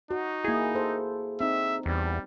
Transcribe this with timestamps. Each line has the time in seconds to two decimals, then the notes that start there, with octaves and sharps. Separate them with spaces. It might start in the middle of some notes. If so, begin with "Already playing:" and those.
0.11 D#4 F#4
0.44 A#3 E4 G#4
0.75 A4 C5
1.41 C4 D#4 E5
1.86 E2 G3